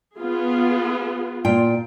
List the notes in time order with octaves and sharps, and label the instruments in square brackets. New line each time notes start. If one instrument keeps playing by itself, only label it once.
[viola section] B3 F4 G#4
[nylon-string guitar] A#2 F4 G5